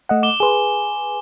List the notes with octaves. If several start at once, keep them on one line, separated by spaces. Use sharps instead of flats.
A3 D#5 F#5
D6 E7 G7
G#4 B4 G#5 C6